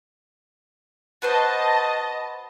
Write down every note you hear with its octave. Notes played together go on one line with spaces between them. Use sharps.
F#4 B4 C5 D#5 A5